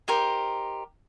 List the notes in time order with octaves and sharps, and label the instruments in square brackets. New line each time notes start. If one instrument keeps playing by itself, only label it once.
[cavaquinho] D#4 G4 A#4 C5